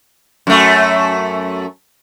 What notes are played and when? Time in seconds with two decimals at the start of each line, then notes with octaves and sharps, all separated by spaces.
0.47 F#2 A3